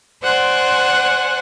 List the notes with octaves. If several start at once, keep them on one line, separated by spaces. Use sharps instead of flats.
C5 D5 F#5 G#5 C6